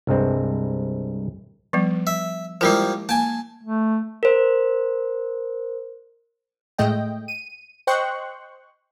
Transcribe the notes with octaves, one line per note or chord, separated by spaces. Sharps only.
C2 G2 G#3 C4
F3 G3 B3
E5
F3 G3 G#3 A#3 E4 A#4
A#3 G#5 A5
A3
A#4 C5
A2 G#3 A3 D#5 G5
D#7
C5 D#5 G5 C6 C#6 F#6